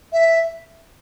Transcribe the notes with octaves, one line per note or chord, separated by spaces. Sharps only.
E5